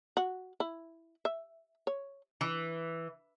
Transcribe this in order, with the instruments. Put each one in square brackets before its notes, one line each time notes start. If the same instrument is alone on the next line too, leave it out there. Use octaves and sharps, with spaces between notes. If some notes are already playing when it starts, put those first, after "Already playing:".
[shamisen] F#4
E4
E5
C#5
[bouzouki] E3